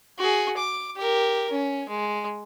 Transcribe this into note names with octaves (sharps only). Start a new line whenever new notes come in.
F#4 G#4
D6
G4 A#4
C#4
G#3